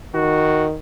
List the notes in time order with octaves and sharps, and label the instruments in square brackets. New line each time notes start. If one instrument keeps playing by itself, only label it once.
[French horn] D#3 [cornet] F#4